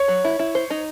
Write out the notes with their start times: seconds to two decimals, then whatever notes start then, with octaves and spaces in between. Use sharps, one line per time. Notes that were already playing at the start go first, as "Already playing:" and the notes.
Already playing: C#5
0.08 F#3
0.25 E4
0.39 E4
0.55 C5
0.70 D#4